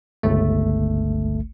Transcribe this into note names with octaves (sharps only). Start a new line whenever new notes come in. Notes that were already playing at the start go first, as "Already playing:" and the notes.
G1 C#2 A3